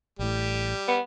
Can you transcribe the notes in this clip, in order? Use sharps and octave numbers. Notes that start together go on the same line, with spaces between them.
A1 A2 G3
B3